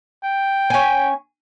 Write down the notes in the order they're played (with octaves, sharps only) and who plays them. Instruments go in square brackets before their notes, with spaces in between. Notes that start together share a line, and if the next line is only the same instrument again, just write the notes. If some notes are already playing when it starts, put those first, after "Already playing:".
[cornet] G5
[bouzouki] C#4 G#5